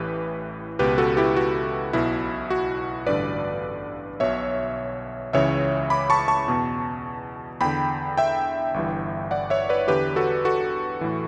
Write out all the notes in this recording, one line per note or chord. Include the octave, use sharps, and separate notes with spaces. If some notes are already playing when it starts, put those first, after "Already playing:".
Already playing: A1 A2 E3 G4 B4
C#2 B2 G4 B4
F#4 A4
E4 G4
F#4
B1 B2 E4
F#4
A1 G2 D3 B4 D5
B1 B2 C#5 E5
C#2 C#3 E3 C#5 E5
B5 D6
A5 C#6
A5 C#6
E2 B2
E2 D3 G5 B5
E5 G5
G1 G2 E3
D5 F#5
C#5 E5
B4 D5
E2 D3 G4 B4
F#4 A4
F#4 A4
A2 E3